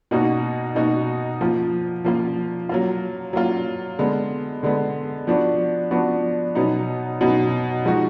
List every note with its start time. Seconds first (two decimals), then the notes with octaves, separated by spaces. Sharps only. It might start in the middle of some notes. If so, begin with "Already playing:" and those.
0.11 B2 A#3 D#4 F#4
0.75 B2 A#3 D#4 F#4
1.41 F3 A#3 F4
2.04 F3 A#3 F4
2.69 F#3 A#3 F4
3.33 F#3 A#3 F4
3.99 D3 G#3 B3
4.63 D3 G#3 B3
5.27 F3 B3 D4 F#4
5.91 F3 B3 D4 F#4
6.55 B2 F#3 B3 D#4
7.20 B2 F#3 B3 D#4
7.85 F3 G#3 D#4 F#4